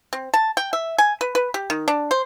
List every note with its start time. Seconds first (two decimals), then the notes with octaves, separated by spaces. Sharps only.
0.13 C4
0.34 A5
0.57 G5
0.73 E5
0.98 G#5
1.21 B4
1.35 B4
1.54 G4
1.70 D#3
1.88 D4
2.11 C5